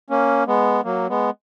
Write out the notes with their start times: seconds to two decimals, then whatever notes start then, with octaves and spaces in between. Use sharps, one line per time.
0.10 A#3 C#4
0.47 G#3 B3
0.84 F#3 A#3
1.10 G#3 B3